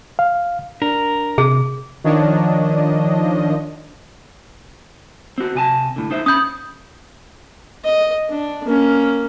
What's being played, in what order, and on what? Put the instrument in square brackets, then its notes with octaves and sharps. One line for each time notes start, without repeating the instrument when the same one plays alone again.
[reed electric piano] F5
[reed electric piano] D4 [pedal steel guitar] A#4
[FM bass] C3 [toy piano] G#4
[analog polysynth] D#3 F3 D4 C#5 D#5
[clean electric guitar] C4 F#4
C3 G#5 A5
A2 D3
D#4 C5 E5
[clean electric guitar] C#4 B5 [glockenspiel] D#6 G6
[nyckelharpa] D#5
D4
A#3 C#4